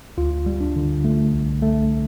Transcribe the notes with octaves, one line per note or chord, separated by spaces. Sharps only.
D2 F4
G3
D4
D3
A3
C2
A3